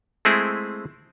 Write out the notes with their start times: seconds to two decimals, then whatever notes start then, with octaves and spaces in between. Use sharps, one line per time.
0.25 G#3 A3 C4 E4 G#4